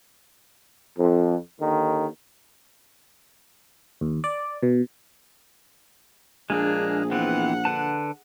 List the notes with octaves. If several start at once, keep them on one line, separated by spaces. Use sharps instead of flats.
F2
D#2 D3 D#3
D#2
D5
B2
A#1 G#3 A#3 D4 G#4
E3 B3 C4 F#5
D3 B4 A5